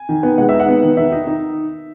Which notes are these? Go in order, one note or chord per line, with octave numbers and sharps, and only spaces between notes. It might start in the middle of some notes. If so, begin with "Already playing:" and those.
Already playing: G#5
D#3
B3
G#3 F#5
D#4 E5
F#5
B3
D#3
D#3 E5
D#4
D#4